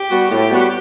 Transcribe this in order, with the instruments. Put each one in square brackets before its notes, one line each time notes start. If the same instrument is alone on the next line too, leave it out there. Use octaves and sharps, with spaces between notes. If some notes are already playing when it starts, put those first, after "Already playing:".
Already playing: [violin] G4
[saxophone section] G3 B3 F#4
[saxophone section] A2 [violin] G4
[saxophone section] G3 B3 F#4